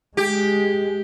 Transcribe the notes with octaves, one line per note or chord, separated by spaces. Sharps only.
G#3 G4